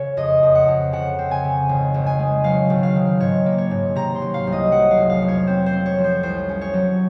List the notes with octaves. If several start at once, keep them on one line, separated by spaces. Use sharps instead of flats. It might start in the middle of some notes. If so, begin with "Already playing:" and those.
Already playing: C#3 C#5
F2 D#5
F2
F#5
F2
C#3 F#5
C4
G#5
C#3
G#1
G#1
G#5
G#3
F#3 F5
G#1
F5
D#3
G#2 C#5
A#3
C#5
G#2
C3 A#5
C6
F#3
F5
C2
D#5
F#3 F#5
F5
F1
F5
F2
C#5
C4 C5
C5
C4
C#5
F3
C5
C2 C5
C#4
C#5
F#3